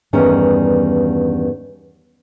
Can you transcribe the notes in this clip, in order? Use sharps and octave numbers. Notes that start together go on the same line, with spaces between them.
E2 G2 D#3 G3 C#4